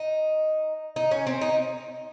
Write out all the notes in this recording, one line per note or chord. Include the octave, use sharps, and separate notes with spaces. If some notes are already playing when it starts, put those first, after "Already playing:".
Already playing: D#4
D#4
C#4
C4
D#4